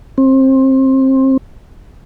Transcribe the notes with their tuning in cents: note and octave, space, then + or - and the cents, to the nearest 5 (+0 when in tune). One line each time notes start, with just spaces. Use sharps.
C4 +25